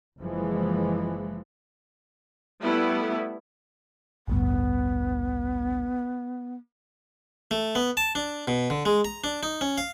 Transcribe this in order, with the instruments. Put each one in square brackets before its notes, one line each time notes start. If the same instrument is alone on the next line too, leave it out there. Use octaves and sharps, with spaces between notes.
[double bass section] F#1 E3 F3 G#3
[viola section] G3 A3 B3 E4
[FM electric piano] A1 D2 G2 [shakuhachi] B3
[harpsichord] A3
B3
A5
D4
B2
D3
G#3
A#5
D4
D#4
C#4
F5